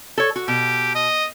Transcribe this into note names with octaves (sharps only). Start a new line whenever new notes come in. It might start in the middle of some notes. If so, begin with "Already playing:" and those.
A4 C#5
F#4
B2 G4
D#5